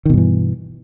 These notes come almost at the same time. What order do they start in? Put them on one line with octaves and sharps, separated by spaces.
D#3 B2 G2 E3